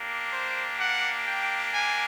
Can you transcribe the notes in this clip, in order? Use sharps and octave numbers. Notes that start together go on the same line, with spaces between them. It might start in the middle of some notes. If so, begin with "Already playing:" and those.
Already playing: A#3 D4 G4
C5
F#5
G5
G#5